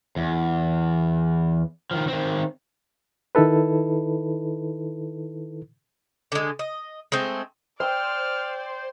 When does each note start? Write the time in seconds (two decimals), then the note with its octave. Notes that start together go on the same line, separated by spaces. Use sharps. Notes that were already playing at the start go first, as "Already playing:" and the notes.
0.16 E2
1.91 D#3 F3
2.08 D#3 C4
3.35 D#3 D#4 E4 A4 B4
6.32 D3 G#3
6.59 D#5
7.12 G#3 A3 C4
7.80 C5 D5 G5 E6 F6